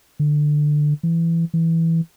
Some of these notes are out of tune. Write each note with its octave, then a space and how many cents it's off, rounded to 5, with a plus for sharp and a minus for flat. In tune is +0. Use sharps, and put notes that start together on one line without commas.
D3 +15
E3 +15
E3 -5